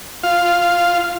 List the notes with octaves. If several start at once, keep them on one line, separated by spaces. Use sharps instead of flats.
F4 F5